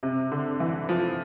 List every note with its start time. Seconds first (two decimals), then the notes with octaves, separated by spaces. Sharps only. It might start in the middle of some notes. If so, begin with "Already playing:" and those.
0.03 C3
0.32 D3
0.60 E3
0.89 F3